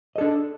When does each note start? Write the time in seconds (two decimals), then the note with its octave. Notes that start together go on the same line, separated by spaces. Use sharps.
0.16 D#5
0.18 A4
0.21 D4